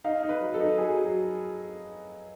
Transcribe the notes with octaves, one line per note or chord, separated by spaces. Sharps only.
D#4 F5
D#4
B4
F#3
A4
D#4
F#3 G#4
F#3